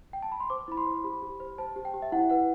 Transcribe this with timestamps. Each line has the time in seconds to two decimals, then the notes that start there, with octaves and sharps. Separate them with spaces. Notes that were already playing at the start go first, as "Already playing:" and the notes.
0.13 G5
0.23 A5
0.32 B5
0.40 C6
0.50 C5 D6
0.68 E4 B5
0.77 C6
0.86 C5
1.04 G4 B5
1.22 G4
1.40 C5
1.58 C5 A5
1.76 G4
1.85 G5
1.94 G4
2.02 E5
2.12 E4 F#5
2.30 B4 F#5